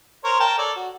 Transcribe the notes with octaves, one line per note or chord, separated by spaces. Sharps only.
A#4 C5 C#5
A#4 G5 A5
A4 C#5 D5
F#4